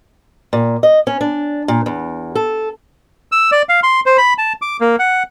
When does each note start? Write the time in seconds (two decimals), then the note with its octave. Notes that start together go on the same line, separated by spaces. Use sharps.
0.53 A#2
0.83 D#5
1.07 C#4
1.21 D4
1.68 A#2
1.86 E2
2.35 A4
3.32 E6
3.52 D5
3.69 F5
3.83 C6
4.06 C5
4.18 B5
4.38 A5
4.62 D6
4.81 A#3
4.99 F#5